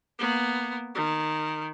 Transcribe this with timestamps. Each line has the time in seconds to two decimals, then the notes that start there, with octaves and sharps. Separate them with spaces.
0.19 A#3 B3
0.95 D#3